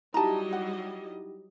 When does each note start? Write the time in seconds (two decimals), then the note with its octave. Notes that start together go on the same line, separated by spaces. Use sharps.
0.14 F#3 G3 D#4 E4 G4 D#5 A5 A#5
0.53 F#5